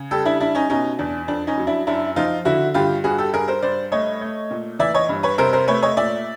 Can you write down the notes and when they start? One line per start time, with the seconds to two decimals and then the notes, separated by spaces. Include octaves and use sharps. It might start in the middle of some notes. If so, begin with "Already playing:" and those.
Already playing: C#3
0.11 G3 G4 A4
0.25 D4 E4
0.40 G3 D4 E4
0.55 C#4 D#4
0.70 B2 C#4 D#4
0.99 E2 D4
1.28 F2 D4
1.47 C#4 D#4
1.58 F#3
1.67 D4 E4
1.87 F#2 D4 E4
2.16 F3 D#4 F4
2.45 D3 E4 F#4
2.74 G2 F4 G4
3.04 G2 F#4 G#4
3.18 G4 A4
3.33 G2 G#4 A#4
3.48 A#4 C5
3.62 G2 C5 D5
3.92 A3 C#5 D#5
4.21 A3
4.51 A#2
4.79 E3 D5 E5
4.94 C#5 D#5
5.09 G2
5.23 B4 C#5
5.38 C3 A#4 C5
5.53 A#4 C5
5.67 A3 B4 C#5
5.82 C#5 D#5
5.97 A#2 D5 E5